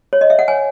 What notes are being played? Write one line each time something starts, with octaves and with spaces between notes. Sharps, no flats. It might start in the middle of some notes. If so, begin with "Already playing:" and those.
C#5
D#5
E5
F#5
C#5 G#5